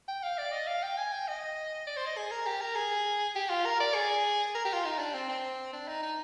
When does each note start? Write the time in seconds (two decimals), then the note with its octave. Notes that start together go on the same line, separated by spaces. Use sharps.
0.08 G5
0.23 F5
0.38 D5
0.52 D#5
0.67 F5
0.83 G5
0.98 G#5
1.12 G5
1.28 D#5
1.87 D5
1.97 C5
2.06 D#5
2.17 G#4
2.31 A#4
2.46 G4
2.61 A#4
2.75 G#4
3.35 G4
3.50 F4
3.65 A#4
3.80 D5
3.94 G#4
4.55 A#4
4.65 G4
4.74 F4
4.85 D#4
4.99 D4
5.14 C4
5.29 C4
5.73 D4
5.88 D#4
6.03 D#4